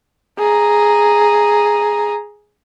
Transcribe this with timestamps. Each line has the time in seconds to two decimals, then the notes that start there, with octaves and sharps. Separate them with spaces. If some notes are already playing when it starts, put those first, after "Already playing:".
0.39 G#4 A#5